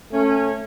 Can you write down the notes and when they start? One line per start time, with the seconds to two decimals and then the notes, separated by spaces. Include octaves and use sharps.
0.13 A3 C#4